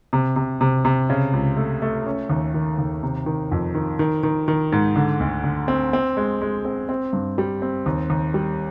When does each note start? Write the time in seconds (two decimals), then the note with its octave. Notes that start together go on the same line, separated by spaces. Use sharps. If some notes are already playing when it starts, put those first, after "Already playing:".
0.13 C3
0.36 C3
0.61 C3
0.85 C3
1.10 C#3
1.33 C#2
1.57 A3
1.82 A3
2.07 C#4
2.29 D#2
2.54 D#3
2.78 D#2
3.03 C3
3.26 D#3
3.52 F2
3.75 D#3
3.99 D#3
4.23 D#3
4.48 D#3
4.72 G#2
4.96 D3
5.20 D2
5.44 D3
5.68 C4
5.93 C4
6.17 G#3
6.42 G#3
6.65 C4
6.89 C4
7.13 G2
7.38 G3
7.62 C4
7.86 D#2
8.10 D#2
8.34 G3